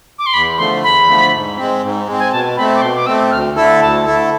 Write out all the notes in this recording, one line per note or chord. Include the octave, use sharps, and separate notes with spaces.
D6
C6
E2 B5
D3 F3 A3 C6
E2 B5
D3 F3 A3
G#2
G#3 C4
G#2
G#3 C4
G#5
B2 A5
A3 C4 B5
D6
B2 C6
D6
A3 C4 E6
D2 F6
D3 A3 E4 A4 E6
D2 A5
D3 A3 E4 A4